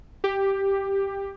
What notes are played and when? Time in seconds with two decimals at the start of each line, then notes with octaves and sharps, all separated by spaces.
0.24 G4